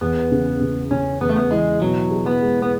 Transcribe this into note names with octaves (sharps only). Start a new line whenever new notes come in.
E2 B3
C#3
C#3
C#3 C#4
E2 B3
A3
B3
E3 G#3
B2 F#3
G#4
B3
G#3
B3